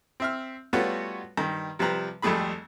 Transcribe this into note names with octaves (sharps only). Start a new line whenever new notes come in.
C4 E5 F6
G3 A3 B3 F4 F#4 C#5
G2 D#3
C3 F3 G3 B4 A#5
G#1 F2 G3 A3 G#4 B5